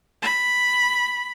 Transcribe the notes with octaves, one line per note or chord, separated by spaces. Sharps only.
B5